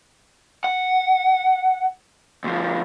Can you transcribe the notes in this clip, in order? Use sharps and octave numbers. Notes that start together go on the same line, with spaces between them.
F#5
D2 F3